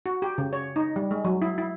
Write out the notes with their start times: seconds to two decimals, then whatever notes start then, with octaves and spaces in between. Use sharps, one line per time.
0.06 F#4
0.22 G4
0.38 C#3
0.53 C#5
0.76 D#4
0.96 G3
1.11 G#3
1.25 F#3
1.42 E4
1.58 E4